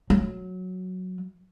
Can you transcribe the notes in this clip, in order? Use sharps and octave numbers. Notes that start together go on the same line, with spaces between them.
F#3